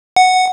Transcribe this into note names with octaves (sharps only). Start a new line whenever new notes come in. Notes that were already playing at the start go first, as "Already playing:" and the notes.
F#5